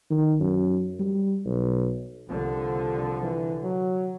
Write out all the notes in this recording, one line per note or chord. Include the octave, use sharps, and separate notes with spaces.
D#3
F#2
G3
B1
C2 D3 F3
E3
F#3